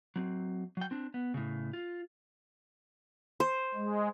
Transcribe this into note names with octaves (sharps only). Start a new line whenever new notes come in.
F#3 C4
F#3 G5
C4 D4
B3
A2 C#3
F4
C5
G#3